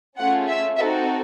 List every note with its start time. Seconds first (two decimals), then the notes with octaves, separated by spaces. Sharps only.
0.19 A3 C#4 F4 G#4 F#5
0.49 E5
0.78 C4 D#4 F#4 A4 E5